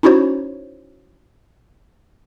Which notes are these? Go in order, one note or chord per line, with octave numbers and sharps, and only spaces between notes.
C#4 D#4 E4 F#4 C5 C#5